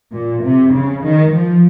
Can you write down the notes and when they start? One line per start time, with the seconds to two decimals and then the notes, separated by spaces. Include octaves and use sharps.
0.12 A#2
0.43 C3
0.72 C#3
1.03 D#3
1.32 F3